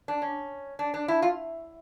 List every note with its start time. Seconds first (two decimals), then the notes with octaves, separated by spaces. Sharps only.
0.08 D4
0.22 C#4
0.79 D4
0.94 D4
1.08 E4
1.22 F4